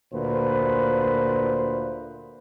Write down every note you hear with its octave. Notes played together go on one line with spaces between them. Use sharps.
D2 A#2 B4 C5